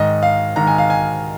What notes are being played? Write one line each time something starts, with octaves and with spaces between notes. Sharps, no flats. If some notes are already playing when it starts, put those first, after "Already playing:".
Already playing: G#2 D#3 D#5
F5
G#2 D#3 A#5
G#5
F5
G#5